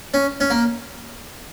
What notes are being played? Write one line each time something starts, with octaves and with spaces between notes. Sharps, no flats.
C#4
C#4
A#3